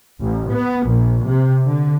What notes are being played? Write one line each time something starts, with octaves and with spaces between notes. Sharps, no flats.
A1
B3
A#1
C3
D3